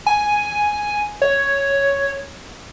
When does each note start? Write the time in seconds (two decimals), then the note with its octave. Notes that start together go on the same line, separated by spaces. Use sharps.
0.06 G#5
1.22 C#5